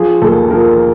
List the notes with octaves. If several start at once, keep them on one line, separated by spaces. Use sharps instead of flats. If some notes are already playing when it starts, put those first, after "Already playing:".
Already playing: F3 G#4
D#2 A4
F3 A#4